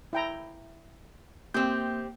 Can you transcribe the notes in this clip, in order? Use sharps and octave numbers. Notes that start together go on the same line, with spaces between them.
E4 G5 A#5
A#3 C4 G4 G6